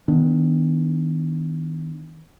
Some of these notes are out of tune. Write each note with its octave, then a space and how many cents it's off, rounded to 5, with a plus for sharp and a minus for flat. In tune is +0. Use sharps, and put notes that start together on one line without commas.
D#3 +35 B3 +5 D4 +0